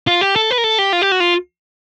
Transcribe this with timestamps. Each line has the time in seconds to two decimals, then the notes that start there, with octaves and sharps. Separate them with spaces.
0.07 F4
0.21 G4
0.36 A4
0.51 B4
0.58 A#4
0.64 A4
0.79 G4
0.93 F4
1.02 G4
1.12 F#4
1.20 F4